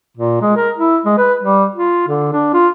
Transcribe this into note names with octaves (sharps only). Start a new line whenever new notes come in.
A#2
G#3
A#4
E4
G#3
B4
G3
F4
D3
D4
F4